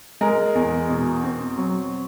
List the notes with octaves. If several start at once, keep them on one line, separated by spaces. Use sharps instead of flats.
G#3 A#4
E2
B2
C4
F#3